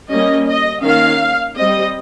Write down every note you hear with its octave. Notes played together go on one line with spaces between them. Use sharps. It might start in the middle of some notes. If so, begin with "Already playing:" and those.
G3 A#3 C#4 D#5
D#5
D#3 A#3 C#4 F5
G3 C4 D#5